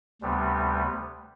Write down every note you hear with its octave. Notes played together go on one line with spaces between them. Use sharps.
D2 C3 G3 B3